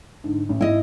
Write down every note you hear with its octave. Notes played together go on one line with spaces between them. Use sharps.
G#2 D3
A1
G#1 E4 D#5